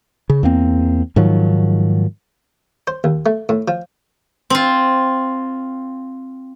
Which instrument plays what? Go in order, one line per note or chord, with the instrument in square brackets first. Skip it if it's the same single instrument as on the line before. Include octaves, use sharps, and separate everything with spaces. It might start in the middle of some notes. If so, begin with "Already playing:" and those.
[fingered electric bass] C#3
E2 A#3 C4
G#2 D#3 F3 F#3
[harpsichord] C5
D#2
A3
A2
F3
[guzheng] C4 F4